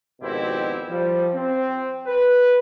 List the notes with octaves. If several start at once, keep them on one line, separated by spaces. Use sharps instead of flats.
G#1 F2 B2 C4 E4 G4
F3 G3
C4
B4